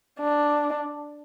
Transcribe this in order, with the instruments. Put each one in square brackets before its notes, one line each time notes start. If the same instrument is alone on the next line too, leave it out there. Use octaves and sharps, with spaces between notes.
[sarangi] D4